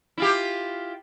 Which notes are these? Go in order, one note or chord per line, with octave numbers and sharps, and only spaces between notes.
E4 F4 G4